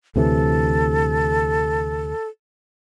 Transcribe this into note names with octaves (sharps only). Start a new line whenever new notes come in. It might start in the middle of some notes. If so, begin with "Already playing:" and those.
D2 C3 E3 A4